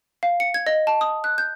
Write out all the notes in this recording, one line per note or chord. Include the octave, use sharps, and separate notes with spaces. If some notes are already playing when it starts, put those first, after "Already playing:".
F5
C#7
G#6
D#5
A5
D#6
F#6
G6